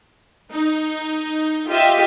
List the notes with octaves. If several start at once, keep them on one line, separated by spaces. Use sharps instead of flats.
D#4
F4 G4 D#5 E5